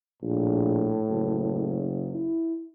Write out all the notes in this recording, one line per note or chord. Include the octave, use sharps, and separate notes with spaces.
A#1 A2
F#1
E4